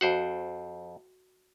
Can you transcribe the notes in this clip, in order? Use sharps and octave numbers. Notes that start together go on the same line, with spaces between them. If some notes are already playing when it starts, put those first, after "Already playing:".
F2 F#4 C5 F#5